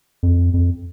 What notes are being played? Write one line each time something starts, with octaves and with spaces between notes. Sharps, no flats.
F2
F2